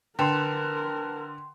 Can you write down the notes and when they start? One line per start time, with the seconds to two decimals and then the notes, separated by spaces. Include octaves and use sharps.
0.19 D3 A#4 B4 G5 A5 C6